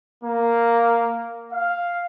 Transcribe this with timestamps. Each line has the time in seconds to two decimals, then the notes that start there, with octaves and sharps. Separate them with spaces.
0.24 A#3
1.52 F5